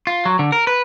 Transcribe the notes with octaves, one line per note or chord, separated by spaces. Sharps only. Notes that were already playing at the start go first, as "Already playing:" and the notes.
F4
F#3
D3
A#4
B4